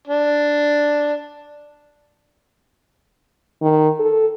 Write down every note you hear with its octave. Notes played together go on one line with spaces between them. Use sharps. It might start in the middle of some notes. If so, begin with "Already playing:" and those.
D4
D#3
A4